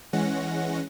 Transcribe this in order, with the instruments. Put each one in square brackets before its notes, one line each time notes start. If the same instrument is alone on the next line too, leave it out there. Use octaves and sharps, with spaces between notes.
[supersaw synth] E3 G#3 C#4 F#5 A#6